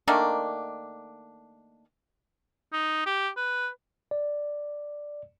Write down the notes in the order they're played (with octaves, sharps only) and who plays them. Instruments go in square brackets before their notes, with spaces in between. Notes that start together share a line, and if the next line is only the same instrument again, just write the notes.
[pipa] D#3 A3 A#3 D4
[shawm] D#4
G4
B4
[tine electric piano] D5